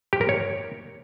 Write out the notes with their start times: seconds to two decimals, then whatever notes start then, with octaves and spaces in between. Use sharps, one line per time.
0.13 G4
0.21 A#4
0.29 C#5